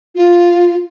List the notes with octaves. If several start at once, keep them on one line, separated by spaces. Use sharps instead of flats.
F4